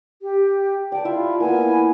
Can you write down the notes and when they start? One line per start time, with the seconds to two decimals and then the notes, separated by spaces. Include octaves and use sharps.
0.22 G4
0.92 D5 G5 A5
1.05 E4 F4 E5
1.40 A#3 B3 E4 G#5